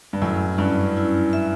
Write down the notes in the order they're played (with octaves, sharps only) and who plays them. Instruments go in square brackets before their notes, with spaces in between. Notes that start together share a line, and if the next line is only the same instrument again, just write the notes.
[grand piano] G2
[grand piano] F#2 A2 [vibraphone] E4
[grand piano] G2 [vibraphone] C#4
[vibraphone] E4
E5